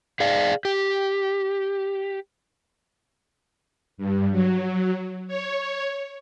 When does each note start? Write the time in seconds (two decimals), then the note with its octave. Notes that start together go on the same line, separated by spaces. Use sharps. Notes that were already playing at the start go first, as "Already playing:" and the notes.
0.20 G#4 D5 F5
0.65 G4
3.98 G2
4.31 F#3
5.28 C#5